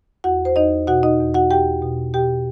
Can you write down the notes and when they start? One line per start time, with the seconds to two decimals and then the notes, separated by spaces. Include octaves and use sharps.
0.24 E2 F#4 F#5
0.45 C5
0.56 E2 D#4 D#5
0.87 B2 F#4 F#5
1.03 D#4 D#5
1.20 E2
1.34 F#4 F#5
1.50 E2 G4 G5
1.82 B2
2.14 B2 G4 G5